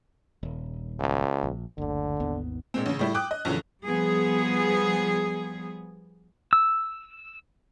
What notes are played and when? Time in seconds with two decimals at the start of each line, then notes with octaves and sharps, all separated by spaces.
0.43 D#1
1.00 C#2
1.43 A#1
1.78 F#1 D2 D3
2.20 G#1 D#2 B3
2.74 A#2 G#3 C4
2.86 A1 C#3
2.99 A2 G3 E4
3.14 G5 D6 D#6 F#6
3.31 D#5
3.45 A#1 F#2 D3 E3
3.85 F3 G3 B3 G#4
6.53 E6